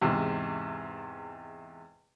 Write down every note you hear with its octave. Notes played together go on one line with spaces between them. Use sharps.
E2 G#2 C3